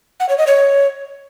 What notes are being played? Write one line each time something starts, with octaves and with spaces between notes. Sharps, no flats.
F#5
C#5
D#5
C#5